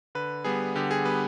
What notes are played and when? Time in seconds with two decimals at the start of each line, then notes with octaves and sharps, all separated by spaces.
0.15 D3 B4
0.44 G3 B3 G#4
0.76 D3 G4
0.91 G#4
1.05 G3 B3 B4